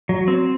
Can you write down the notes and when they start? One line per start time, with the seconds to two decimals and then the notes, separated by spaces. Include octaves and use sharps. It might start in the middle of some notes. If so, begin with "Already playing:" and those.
0.09 F#3
0.28 C4